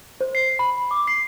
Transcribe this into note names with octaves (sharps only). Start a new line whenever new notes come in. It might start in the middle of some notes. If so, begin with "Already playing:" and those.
C5
C7
B5
D6
C7